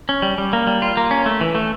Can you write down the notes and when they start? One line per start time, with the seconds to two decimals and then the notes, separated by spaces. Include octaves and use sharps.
0.09 C#4
0.22 G3
0.38 G3
0.53 A#3
0.67 G3
0.82 F4
0.97 A#3
1.11 C#4
1.26 A3
1.41 E3
1.55 A3